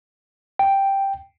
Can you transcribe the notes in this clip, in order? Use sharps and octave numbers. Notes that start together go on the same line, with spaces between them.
G5